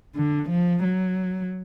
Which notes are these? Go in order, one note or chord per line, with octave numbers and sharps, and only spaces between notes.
D3
F3
F#3